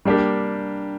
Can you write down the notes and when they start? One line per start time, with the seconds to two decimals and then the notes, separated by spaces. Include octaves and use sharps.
0.05 G3 A#3 D4 G4